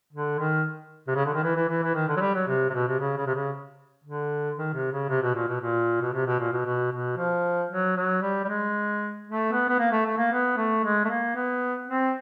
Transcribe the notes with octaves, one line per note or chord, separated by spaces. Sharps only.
D3
D#3
C3
C#3
D3
D#3
E3
E3
E3
E3
D#3
D3
F#3
G3
F#3
C3
C3
B2
C3
C#3
C#3
C3
C#3
D3
D#3
C3
C#3
C3
B2
A#2
B2
A#2
B2
C3
B2
A#2
B2
B2
B2
F3
F#3
F#3
G3
G3
G#3
A3
B3
B3
A#3
A3
A3
A#3
B3
A3
G#3
A3
A#3
B3
C4